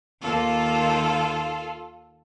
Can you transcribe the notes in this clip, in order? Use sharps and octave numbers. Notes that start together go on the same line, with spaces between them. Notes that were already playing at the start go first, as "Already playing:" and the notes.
D#2 D#3 A#3 F4 A4